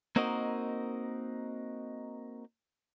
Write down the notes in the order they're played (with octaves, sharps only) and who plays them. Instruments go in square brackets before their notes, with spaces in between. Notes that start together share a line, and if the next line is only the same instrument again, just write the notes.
[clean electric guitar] A#3 C4 D#4 F#4 A#4 D#5